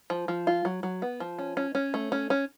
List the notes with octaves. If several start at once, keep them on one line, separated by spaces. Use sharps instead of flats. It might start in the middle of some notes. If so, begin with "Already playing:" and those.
F3
F3
F4
F#3
F#3
B3
F3
C#4
C#4
C#4
A3
C#4
C#4